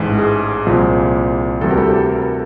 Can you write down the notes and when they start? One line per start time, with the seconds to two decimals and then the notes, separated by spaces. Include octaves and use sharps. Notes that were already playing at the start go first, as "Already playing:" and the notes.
Already playing: A1 G#2 E3
0.19 G#4
0.66 C2 A#2 F3
1.61 D2 C3 E3 G3 A4
1.71 A#4
1.77 G4 A4
2.10 A#4
2.22 A4